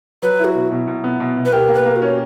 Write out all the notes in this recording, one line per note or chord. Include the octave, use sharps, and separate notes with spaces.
F#3 B4
E4
F#4
B2
B2
B2
B3
B2
B2
B4
G4 A#4
A#3
B4
A#3
F#4
C#4